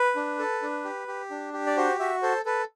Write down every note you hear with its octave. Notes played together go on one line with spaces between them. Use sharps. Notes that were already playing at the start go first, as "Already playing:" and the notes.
Already playing: B4
D4
A4
D4
G4
G4
D4
G4
D5
F#4 C5
F#4 E5
A4 C5
A4 B4